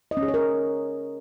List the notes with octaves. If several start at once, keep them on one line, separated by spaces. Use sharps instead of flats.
D#5
C#4
G#4
C#5
A#4